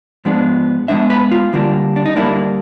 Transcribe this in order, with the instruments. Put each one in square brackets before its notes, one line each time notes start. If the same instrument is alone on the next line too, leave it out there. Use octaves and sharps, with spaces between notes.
[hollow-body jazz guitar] G#2 F3 G#3 B3 D4
G#2 F3 G#3 B3 D4 E5
B4
F4
D2 D3 G3 A#3 D4
D4
D#4
D2 D3 G3 A#3 D4 E4